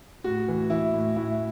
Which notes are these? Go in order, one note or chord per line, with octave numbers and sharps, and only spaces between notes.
A2 F#4
E3
E3 E4
A2
A2 E4